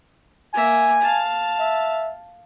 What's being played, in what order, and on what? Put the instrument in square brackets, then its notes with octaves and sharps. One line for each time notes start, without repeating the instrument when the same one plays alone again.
[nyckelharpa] A#3 E5 [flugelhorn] G#5
[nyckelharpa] F5 A5
[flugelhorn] E5